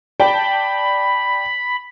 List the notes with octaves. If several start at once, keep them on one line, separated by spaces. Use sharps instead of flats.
D5 G5 A5 B5